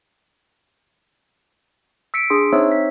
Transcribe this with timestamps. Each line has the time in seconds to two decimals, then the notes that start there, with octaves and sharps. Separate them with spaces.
2.14 E6 B6 C#7 D7
2.30 D4 G#4 C6 D#6
2.53 C4 D#4 C5 C#5 E5 E6
2.72 B6